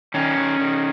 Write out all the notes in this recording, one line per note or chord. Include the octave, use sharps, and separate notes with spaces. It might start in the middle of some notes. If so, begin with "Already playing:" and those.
D#3 C#4
D#3
D#3